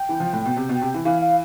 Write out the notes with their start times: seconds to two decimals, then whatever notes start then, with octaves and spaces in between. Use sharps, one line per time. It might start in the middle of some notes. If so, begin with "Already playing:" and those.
Already playing: G5
0.09 E3
0.20 F3
0.33 A2
0.46 B2
0.57 C3
0.69 B2
0.82 C3
0.94 E3
1.05 E3 F5
1.22 F5